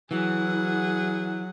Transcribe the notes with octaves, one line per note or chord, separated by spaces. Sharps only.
E3 F#3 G#4 F#5